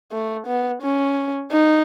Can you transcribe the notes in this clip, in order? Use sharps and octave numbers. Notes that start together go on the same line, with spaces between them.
A3
B3
C#4
D#4